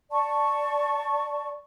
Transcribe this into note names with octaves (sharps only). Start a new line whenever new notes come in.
D5 A5 C#6